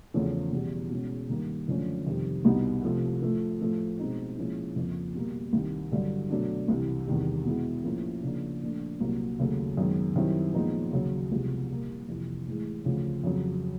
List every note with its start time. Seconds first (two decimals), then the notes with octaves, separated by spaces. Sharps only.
0.14 E2 C#3 F3 A3 C#4
0.52 E2 B2 G3
0.91 B2 G#3 C#4
1.29 G2 D#3 G3 A#3
1.68 F#2 D3 F3 A3 C#4
2.06 F2 C3 D#3 G3 C4
2.45 C2 B2 G3 B3 D#4
2.83 C3 F3 A3
3.22 A2 F3 A3
3.61 A2 F3 A3
3.99 B2 G#3 C4 D#4
4.37 A#2 F3 G#3 C#4 E4
4.76 F2 C#3 F3 A#3
5.15 B2 G3 A#3
5.53 C2 C3 D#3
5.91 G2 D3 F#3
6.30 B2 F#3 A3 D4
6.68 C2 C3 E3
7.07 E2 C3 D#3 G3
7.45 B2 G#3 B3 E4
7.84 A2 F3 A#3 C#4 E4
8.23 C#3 F3 A#3 D4
8.62 A#2 F3 A3 D4
9.00 C2 A#2 F#3 A#3
9.39 D#2 C#3 F#3 A3
9.77 F#2 D#3 G#3 B3
10.15 F#2 D#3 G3 C4 E4
10.54 A#2 F3 G#3 B3 D#4
10.93 D#2 C#3 F#3
11.32 C2 C3 F3 G#3 B3
11.70 A#2 G3 A#3
12.09 F2 C3 E3
12.47 A2 E3 G#3
12.85 D2 C#3 F3
13.24 F2 C#3 F#3